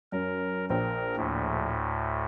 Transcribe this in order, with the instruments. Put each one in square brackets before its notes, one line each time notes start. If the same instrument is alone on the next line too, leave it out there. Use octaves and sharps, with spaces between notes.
[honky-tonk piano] F#2 [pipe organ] A#4
[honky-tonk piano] A#1 C5 G5 [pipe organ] A#4
[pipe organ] D2 A2